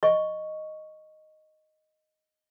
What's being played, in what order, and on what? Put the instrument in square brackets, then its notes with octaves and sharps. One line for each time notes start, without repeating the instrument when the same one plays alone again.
[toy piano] D#5 C#6